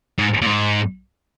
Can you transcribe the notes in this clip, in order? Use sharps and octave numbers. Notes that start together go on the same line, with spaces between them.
G#2
A#2
G#2